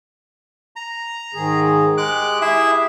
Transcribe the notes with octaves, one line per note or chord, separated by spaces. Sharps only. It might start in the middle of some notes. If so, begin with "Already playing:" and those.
A#5
G#2 D#3 G#4
G#3 G4 D6 F#6
E4 G#4 E5